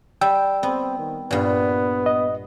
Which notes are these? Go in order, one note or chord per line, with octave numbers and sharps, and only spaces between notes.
G3 G5 E6
B3 C4
D#3
G2 A#2 B3
D#5